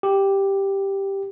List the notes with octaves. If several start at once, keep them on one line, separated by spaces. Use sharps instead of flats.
G4